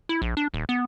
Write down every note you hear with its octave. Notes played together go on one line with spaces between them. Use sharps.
E4
A#1
D4
D#1
B3